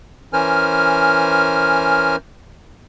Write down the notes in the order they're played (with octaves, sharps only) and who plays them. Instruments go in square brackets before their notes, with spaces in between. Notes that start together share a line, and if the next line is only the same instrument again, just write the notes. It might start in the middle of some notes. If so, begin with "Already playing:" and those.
[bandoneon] E3 C#4 A#4 C5 G#5 F6